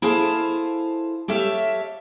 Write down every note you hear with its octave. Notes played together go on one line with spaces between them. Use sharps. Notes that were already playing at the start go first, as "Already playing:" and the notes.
E4 G#4 A4 C5 F5 A5
G4 A4 C#5 E5 F5